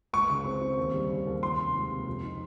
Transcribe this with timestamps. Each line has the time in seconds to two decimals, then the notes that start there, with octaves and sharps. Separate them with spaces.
0.13 C#2 C#6
0.30 C#3
0.45 C4
0.61 C4
0.78 D#2
0.94 G3
1.10 C#3
1.27 D#2
1.42 F3 C6
1.59 C3
1.75 C#2
1.91 C3
2.07 F2
2.23 D#4